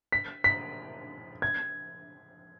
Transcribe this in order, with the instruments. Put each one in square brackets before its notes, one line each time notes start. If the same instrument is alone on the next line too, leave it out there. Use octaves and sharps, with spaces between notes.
[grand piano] B6
B6
G#6